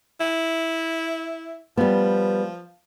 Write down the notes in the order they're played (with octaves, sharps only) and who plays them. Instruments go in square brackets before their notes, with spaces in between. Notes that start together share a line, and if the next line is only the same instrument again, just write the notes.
[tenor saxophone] E4
[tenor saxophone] F3 [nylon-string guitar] G3 B3